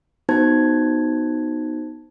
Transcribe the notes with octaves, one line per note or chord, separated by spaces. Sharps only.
B3 D#4 F#4 C5 A5 G#6